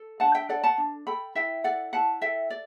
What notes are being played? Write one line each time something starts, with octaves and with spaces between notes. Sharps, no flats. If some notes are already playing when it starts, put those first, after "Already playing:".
Already playing: A4
D4 F#5 A5
E5 G5
A4 D5 F#5
F#5 A5
D4
A4 G5 B5
E4 E5 G5
A4 D5 F#5
E4 F#5 A5
A4 E5 G5
D5